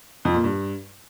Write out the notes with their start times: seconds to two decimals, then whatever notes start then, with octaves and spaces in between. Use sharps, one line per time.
0.25 F2
0.34 A#2
0.44 G2